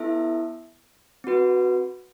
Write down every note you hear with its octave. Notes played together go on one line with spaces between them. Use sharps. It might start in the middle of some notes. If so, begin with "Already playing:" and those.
Already playing: B3 E4 A4 E5
C4 F#4 B4